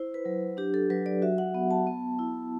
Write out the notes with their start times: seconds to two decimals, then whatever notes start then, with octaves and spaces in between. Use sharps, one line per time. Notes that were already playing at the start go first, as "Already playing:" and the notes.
Already playing: E4 C5
0.14 B4
0.25 F#3
0.57 D4 G4
0.74 A4
0.90 F#3 B4
1.06 D5
1.22 F#4 E5
1.38 F#5
1.54 B3
1.71 A5
1.87 B3
2.19 E4